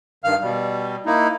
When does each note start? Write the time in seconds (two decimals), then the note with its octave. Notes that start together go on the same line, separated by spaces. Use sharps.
0.24 G2 D#3 F5 F6
0.42 B2 G3
1.06 A#3 D#4 E4